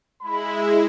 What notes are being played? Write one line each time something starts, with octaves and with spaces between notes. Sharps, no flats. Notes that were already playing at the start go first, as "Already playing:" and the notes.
G#3 E4 B5